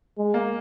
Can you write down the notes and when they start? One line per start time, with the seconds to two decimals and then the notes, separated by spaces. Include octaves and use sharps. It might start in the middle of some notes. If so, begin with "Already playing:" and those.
0.18 G#3
0.34 A#3